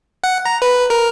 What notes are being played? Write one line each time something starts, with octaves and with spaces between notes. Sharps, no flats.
F#5
A#5
B4
A#4